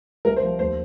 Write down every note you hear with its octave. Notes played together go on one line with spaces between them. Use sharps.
C2 A#4
C5
F3
D#2 C5